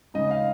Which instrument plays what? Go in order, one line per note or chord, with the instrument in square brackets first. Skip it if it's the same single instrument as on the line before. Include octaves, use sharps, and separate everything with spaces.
[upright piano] C#3 G#3 D#4 D#5
F5